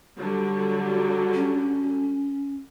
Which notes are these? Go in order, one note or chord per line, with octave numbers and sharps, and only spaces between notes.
D3 F#3 G3
C#4